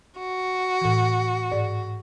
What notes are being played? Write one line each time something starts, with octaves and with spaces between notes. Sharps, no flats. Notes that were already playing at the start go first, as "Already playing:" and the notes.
F#4
A2 E3
G#2 D5